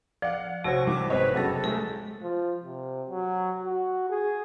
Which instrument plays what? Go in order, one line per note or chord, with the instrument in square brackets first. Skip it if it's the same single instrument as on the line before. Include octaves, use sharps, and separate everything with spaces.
[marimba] F3 [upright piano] D5 [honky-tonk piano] F5 F#5
[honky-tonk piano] A#1 [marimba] C3 [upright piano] F#4 C5 C#5 [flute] C#6
[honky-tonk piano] C2 G2 E3 [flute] D6
[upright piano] G#1 C4 D#5 [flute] B4 [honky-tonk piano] C#5
[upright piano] F#1 F#3 F#5 [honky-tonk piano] G2 C#3 A#6 [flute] A4
[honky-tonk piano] C2 [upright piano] G#3 A3 [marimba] A4
[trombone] F3
C3
F#3
F#4
G#4